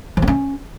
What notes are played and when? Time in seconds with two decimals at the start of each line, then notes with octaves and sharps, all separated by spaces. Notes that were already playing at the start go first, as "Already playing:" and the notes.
0.17 F3
0.22 C4
0.28 C#4